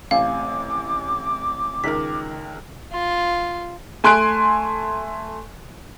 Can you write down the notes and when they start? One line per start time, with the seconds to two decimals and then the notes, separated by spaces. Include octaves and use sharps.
0.11 A1 C3 F5 G#5 D6
1.84 C#2 D#3 A#4 B6
2.92 F4
4.04 A3 G#5 C6 F#6 D7